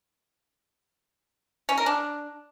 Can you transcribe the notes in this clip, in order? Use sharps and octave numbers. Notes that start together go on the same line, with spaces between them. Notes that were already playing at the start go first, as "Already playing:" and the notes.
C#4
A#4
D4